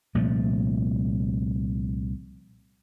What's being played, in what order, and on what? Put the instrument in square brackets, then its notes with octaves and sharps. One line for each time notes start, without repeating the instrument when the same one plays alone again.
[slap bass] C2 A#2 F3 A3